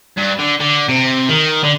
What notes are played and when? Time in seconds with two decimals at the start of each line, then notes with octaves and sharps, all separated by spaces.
0.17 G2
0.39 D3
0.60 D3
0.89 C3
1.29 D#3
1.64 D3